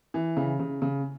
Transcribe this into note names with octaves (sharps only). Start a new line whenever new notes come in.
E3
C#3
C#3
C#3